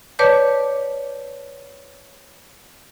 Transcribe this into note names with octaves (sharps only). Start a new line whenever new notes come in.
B4 C#5 D5 A5 D6 G6